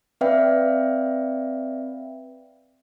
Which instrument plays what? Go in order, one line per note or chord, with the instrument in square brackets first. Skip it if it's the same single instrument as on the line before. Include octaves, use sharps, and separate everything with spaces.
[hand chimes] C4 B4 D5 E5 F5 G5